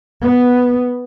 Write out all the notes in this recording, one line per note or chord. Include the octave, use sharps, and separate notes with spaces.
B3